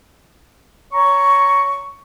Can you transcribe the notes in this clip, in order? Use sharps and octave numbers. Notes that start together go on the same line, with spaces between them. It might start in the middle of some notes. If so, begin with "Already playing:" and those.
C#5 A#5 C#6